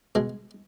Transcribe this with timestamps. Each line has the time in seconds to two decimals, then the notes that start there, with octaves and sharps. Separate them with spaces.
0.15 B2 G#3